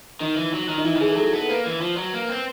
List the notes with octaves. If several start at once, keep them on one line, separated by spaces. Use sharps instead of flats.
D#3 D#4
E3
F#3
D#3
D#4
E3 E4
D#3
E3 G#4
A4
F#3 G#4
B3 A4
A#3 B4
E3
F3
F#3
A#3
C4